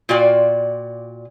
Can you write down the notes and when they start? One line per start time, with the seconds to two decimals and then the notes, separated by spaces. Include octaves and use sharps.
0.09 A#2 F4 F#4 D5 G5